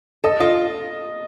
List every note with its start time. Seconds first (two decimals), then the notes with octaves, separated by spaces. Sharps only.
0.24 A4 D#5
0.40 F4 D#5